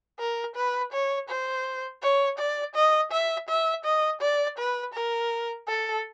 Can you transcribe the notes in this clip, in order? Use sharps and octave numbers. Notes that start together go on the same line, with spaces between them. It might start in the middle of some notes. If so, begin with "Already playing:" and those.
A#4
B4
C#5
C5
C#5
D5
D#5
E5
E5
D#5
D5
B4
A#4
A4